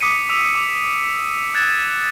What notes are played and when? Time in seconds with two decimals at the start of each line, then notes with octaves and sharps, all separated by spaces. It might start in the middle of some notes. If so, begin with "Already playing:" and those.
0.01 D6 D#6 B6 C#7 D#7
0.29 D6 E6 D7 F7
0.55 D6
1.54 E6 F#6 G#6 A6 E7